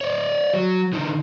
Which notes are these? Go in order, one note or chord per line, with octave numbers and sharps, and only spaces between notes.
C#5 D5
F#3
D3 D#4